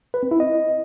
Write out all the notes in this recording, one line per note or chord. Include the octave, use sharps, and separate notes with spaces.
B4
C4
E4
D#5